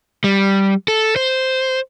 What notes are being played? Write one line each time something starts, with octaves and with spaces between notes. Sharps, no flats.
G3
A4
C5